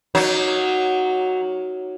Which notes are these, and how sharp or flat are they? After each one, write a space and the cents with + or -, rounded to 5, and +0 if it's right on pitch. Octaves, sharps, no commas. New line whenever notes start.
F#3 +0 A#3 +10 D#4 +0